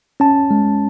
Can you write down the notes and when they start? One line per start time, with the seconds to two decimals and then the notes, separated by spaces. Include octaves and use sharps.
0.20 C#4 A5
0.51 G#3